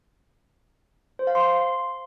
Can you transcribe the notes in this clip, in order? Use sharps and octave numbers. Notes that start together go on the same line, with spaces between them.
C5
F5
C6